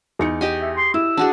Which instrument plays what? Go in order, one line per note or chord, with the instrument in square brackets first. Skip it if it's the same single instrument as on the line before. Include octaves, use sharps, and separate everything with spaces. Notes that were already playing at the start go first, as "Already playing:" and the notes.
[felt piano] E2 D#4 C#7
[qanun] G4 D#5 G#5
[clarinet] E5
C6
[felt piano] E4 [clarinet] E6
[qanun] D4 F#4 G#4